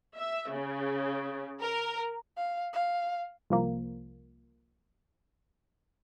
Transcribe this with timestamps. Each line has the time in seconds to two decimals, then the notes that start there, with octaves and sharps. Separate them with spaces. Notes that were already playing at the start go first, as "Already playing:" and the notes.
0.15 E5
0.49 C#3
1.61 A#4
2.37 F5
2.73 F5
3.50 C2 F3 A#3